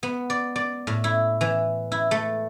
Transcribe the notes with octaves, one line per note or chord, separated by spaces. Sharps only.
B3
D5
D5
A2
E4
E3
E4
A3